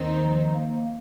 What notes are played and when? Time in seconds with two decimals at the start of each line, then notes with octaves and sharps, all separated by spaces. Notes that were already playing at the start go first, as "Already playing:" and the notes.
Already playing: D#2 D#3 C4 D#4
0.22 F3
0.55 A#3